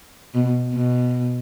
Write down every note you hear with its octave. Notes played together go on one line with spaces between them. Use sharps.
B2
B2